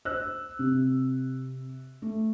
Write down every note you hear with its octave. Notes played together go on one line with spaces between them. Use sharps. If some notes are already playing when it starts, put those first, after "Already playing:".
C5 E6 F#6
C3
A3